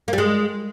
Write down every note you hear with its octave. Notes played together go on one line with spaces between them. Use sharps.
A#3
G3
G#3